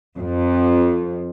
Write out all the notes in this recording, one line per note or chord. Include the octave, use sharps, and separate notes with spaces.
F2